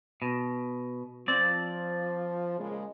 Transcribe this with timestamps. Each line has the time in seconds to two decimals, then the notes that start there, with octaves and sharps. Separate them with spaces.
0.22 B2
1.28 F3 C4 D5
2.59 A#2 C#3 G#3